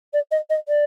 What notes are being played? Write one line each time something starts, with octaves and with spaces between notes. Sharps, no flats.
D5
D#5
D#5
D5